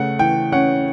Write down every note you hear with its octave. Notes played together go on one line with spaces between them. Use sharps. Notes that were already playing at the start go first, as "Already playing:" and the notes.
Already playing: C#3 A3 F#5
E3 G5
C#4 F#5